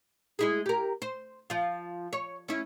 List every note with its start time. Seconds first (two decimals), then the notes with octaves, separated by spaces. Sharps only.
0.39 G#3 E4 G#4
0.66 G4 A#4
1.02 C5
1.50 F3 F4
2.13 C#5
2.48 C#4 E4